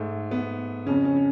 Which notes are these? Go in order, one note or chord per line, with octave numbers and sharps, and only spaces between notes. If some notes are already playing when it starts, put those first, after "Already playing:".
Already playing: G#2 A3
B3
F2 C#3 C#4
C#4
C#4